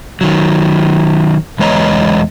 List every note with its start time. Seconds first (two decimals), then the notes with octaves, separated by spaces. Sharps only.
0.21 D#3 F#3
1.59 E2 G#3 B4 C#5 D#5 A#5